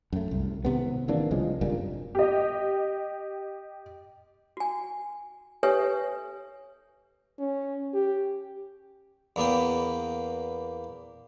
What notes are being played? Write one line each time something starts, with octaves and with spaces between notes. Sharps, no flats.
F#2 A3
C2
G#1 C3 B3
D#3 E3 A#3 D4
C2 C#3 F3 G#3
F#1 G2 A#2
G4 D#5
F#4 G#5
G4 A4 B4 C#5 E5 G#5
C#4
G4
E2 A#3 B3 G5